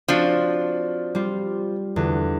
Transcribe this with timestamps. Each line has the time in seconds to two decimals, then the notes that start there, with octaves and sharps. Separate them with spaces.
0.08 F3 C4 D4 F#4
1.15 G3 F4
1.96 E2 D3